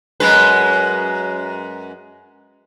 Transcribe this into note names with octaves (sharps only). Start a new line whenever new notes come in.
F#2 G#3 B4